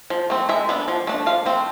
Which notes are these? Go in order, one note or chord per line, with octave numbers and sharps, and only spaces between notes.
F3
A3 C4
G#3 E5
B3 D4
F3
A3 D4
F3 F5
A3 C4